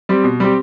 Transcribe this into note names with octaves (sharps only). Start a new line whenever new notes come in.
G3 C4 G4
B2
G3 C4 G4